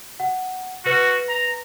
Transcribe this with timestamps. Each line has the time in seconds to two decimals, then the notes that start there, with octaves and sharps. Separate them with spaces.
0.20 F#5
0.85 F#4 B4 A#6
1.29 A#5